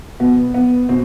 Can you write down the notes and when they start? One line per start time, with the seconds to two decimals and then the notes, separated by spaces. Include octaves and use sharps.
0.20 B2 B3
0.54 B3
0.89 B2 C4